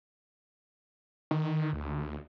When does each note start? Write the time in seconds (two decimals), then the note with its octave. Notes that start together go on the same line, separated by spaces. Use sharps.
1.31 D#3
1.73 D2